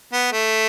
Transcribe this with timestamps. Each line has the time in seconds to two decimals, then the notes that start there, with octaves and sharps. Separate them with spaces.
0.13 B3
0.32 A3